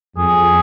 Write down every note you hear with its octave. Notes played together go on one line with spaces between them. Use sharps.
F2 G#4